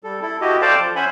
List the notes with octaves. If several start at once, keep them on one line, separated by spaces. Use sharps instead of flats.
G3 A4
E4 A4
E4 F#4 G4 D#5
A4 C5 D5 F5 G5 A5
F3
C#4 C5 E5 F#5 G#5 B5